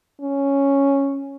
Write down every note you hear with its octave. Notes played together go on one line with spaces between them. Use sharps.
C#4